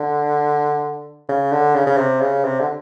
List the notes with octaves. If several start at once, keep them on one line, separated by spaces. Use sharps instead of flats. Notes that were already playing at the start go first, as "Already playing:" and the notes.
Already playing: D3
C#3
D3
C#3
C#3
C3
C#3
C3
D3